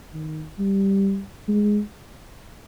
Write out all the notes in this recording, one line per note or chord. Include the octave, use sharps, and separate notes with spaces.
D#3
G3
G#3